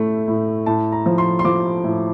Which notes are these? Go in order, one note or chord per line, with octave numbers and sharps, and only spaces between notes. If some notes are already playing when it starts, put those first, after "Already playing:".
Already playing: A2 A3
A2
A2 A5
A#5
F3
C6
C6
F3 D6
A2